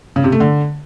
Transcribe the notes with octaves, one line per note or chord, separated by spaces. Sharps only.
C#3
C3
A3
D3